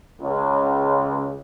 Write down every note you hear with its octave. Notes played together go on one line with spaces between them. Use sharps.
C#2